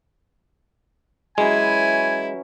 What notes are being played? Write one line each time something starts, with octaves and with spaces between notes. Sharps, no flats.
E3 F#3 G#3 C#4 E4 G#5